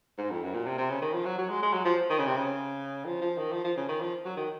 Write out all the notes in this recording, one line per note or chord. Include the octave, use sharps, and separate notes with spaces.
G#2
F2
F#2
A#2
C3
C3
C#3
D#3
F3
F#3
F#3
G#3
G#3
F#3
F3
D#3
C#3
C3
C#3
F3
F3
D#3
F3
F3
C#3
D#3
F3
F#3
D#3